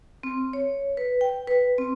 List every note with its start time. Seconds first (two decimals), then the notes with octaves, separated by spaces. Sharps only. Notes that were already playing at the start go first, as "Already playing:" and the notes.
0.23 C4
0.53 C#5
0.97 B4
1.21 G5
1.47 B4
1.78 C4